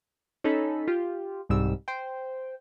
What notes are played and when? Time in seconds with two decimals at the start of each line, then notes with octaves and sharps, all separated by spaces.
0.44 C#4 D#4 A4 B5
0.88 F4 G4
1.49 C2 G#2 G3 E6
1.88 C5 G5